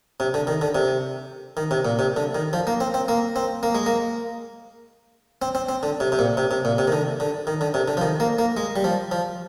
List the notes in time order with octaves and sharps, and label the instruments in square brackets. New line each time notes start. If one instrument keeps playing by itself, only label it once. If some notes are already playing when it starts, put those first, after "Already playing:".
[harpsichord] C3
D3
D#3
D3
C3
D#3
C3
A#2
C3
D3
D#3
F3
A#3
C4
C4
A#3
C4
A#3
G#3
A#3
C4
C4
C4
D3
C3
C3
A#2
C3
C3
A#2
C3
D#3
D3
D3
D#3
D3
C3
D3
F3
D#3
A#3
A#3
G#3
G3
F3
F3